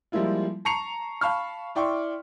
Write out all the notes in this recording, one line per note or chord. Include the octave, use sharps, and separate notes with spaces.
F3 G3 G#3 A#3 E4 F4
A5 A#5 C#6 C7 C#7 F7
F5 A5 B5 C#6 F6
E4 D5 G5 C6 C#6